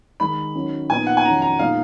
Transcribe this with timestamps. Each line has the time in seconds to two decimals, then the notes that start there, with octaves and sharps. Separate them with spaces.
0.20 D#3 G#3 D#4 B5
0.55 D#3 F#3 C#4
0.89 A#2 F3 B3 D#4 G#5
1.07 F#5
1.17 G#5
1.25 F2 D#3 F#3 C#4 A#5
1.42 A#5
1.59 A#2 G#3 B3 D#4 F5